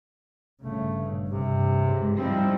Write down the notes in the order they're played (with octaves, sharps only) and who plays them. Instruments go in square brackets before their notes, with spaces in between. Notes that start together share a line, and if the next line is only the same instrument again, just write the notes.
[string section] G1 [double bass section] C#3 [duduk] A3
[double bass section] G2 [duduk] C3
[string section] C#2 G#2
[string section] F3 D#4 E4 [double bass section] G3 [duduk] C4